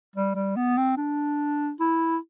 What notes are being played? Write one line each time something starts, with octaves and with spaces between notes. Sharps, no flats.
G3
G3
B3
C4
D4
E4